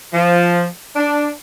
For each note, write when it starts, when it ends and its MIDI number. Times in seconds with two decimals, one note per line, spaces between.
0.13 0.65 53
0.96 1.29 62